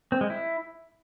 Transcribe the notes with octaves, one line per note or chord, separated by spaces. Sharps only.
C4
G#3
E4